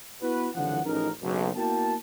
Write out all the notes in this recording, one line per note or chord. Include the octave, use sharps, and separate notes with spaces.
B3 E4 F#4 B4
F#1 C2 D3 E3 F3 F#5
A1 F3 C#4 D#4 G#4 A#4
F#1 B1
A#3 B3 E4 F#4 G5 A5